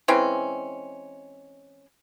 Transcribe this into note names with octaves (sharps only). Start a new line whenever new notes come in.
E3 G#3 C4 C#4